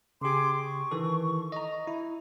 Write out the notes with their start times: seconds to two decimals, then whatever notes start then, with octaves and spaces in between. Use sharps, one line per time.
0.21 C#3 G4 G#4 C6 D6
0.62 C#6
0.91 D#3 E3 A4
1.52 D#5 A#5
1.87 E4